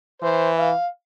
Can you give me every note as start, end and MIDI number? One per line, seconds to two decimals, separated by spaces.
0.22 0.72 52
0.22 0.49 72
0.58 0.86 77